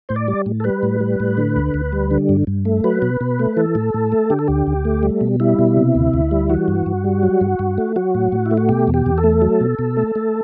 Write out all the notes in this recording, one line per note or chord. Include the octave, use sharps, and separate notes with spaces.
A2 C5
D5
G3
A2
A4
G3 B4
A2
G3
A2
D3
D2
D2
G3
D3
G2
G2
A3
F#3 B4
B2
B2
A3
E3 A4
A2
A2
A3
D3 G4
A4
D2 G4
D2
A3
G3
B2
G3 E4
B2
C3
D2
D2
G3
E3 F#4
G2
G2
G3
F#3
G2
G2
A3
F#3 F#4
A2
A2
E4
A3
F#4
B2 G4
E2
G4
E2
A4
A3
F#3
B2
B2
A3
A3